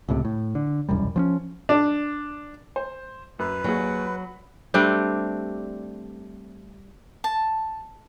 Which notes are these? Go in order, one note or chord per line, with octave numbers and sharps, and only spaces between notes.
C#2 A2 C3
A2
D3
E1 C2 F#2 G3
F3 C4 C#4
D4
C5
F#2 B4
D#2 F#3 G#4
B5
G3 A3 C4 D4
A5